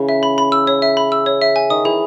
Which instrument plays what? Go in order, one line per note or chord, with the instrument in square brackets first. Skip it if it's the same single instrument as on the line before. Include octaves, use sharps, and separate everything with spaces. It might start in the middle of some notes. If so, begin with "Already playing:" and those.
Already playing: [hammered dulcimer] C#3 E3
[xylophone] E5
B5
B5
E6
C#5
E5
B5
E6
C#5
E5
G#5
[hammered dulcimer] D#3 [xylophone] D#6
[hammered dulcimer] E3 [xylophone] G#4